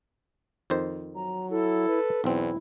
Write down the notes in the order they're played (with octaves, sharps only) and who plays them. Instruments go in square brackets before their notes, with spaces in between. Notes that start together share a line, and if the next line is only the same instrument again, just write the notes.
[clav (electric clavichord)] F2 D#3 C5
[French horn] F#3 [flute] A#5
[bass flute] E4 [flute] A4
[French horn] B4
[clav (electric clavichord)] B1 C4 [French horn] E2 [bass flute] E4